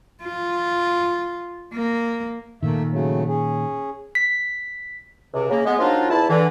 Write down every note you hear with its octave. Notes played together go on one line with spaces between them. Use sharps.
F4
A#3
A#2 D#3 A3 A#3 E5
C#3 F#3 A3
C#4 G#4
B6
C#2 C3
C#3 A#3
G#3 B3
F3 F#3 A#3 D4 D#4 F4
E2 E4 A5
D3 E3